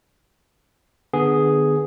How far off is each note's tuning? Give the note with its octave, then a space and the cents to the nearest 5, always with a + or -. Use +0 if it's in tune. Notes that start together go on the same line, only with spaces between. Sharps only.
D3 +30 B3 +0 G#4 +0